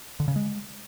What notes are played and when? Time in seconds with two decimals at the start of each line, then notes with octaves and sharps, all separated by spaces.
0.20 D3
0.28 C#3
0.36 G#3